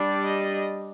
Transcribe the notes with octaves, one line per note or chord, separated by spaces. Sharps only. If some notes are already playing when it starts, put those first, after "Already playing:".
Already playing: G3 D4
D#5